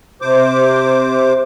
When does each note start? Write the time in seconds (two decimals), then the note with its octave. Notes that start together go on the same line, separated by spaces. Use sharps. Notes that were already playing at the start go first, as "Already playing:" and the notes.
0.21 C3 C5 D6